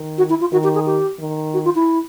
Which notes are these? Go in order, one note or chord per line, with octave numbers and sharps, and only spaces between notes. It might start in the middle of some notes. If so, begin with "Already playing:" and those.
Already playing: D#3
F#4
E4
F4
D#3 F#4
G4
G#4
G4
D#3
F#4
F4
E4